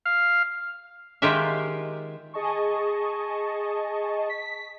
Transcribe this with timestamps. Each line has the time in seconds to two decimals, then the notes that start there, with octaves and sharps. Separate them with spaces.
0.06 F5
1.22 D#3 G#3 F4 G4 A#4 E5
2.34 G#4 D#5 A5 C#6
4.29 B6